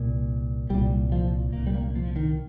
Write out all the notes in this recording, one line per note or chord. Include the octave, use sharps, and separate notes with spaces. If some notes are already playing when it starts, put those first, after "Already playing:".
Already playing: C2 A#2
C2 A#2 G3
F3
C2 A#2 A#3
G3
A#3
F3
D#3